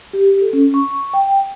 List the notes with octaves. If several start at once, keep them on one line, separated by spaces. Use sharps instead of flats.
G4
A4
C#4
C#6
G5